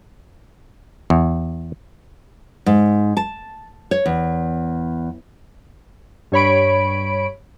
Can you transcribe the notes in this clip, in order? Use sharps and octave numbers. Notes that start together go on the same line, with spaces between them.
E2
G#2
A5
C#5
E2
G2 C#5 B5 D7